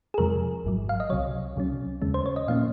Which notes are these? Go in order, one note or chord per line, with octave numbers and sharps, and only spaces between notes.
G#4
F2 C3 F3 G#3 A#4
G#1 G#2 F#3
F5
D#5
C2 C3 F#3 C#5
C#2 C3 F#3 C#4
D#2 C#3 G#3 C#4
C5
C#5
D#5
A#2 F3 A#3 C#4 F5